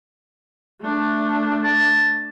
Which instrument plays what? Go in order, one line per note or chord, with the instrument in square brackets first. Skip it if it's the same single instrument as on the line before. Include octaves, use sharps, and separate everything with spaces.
[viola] A3 D4
[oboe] A5